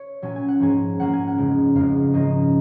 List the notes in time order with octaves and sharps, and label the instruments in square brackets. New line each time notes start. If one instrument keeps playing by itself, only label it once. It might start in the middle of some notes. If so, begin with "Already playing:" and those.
Already playing: [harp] C#5
A#2 F#3 C#4 G#5
G#5
F#5
G#2 F3 A#3 C#4 G#5
G#2 F3 A#3 C#4 F#5
G#5
F#5
F2 C#3 G#3
F2 C#3 G#3 F5
G#2 F3 A#3 C#4 D#5